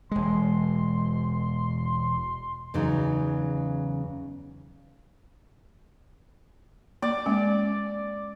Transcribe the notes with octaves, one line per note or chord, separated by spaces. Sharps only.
E1 G#3 C6
E2 C#3 F#3 D#4
A#3 D5
G#3 A#3 C#4